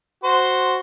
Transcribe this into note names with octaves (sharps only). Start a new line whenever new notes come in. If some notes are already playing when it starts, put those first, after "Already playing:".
F#4 C5